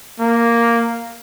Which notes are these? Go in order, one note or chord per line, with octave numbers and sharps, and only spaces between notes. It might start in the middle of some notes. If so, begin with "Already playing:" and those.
A#3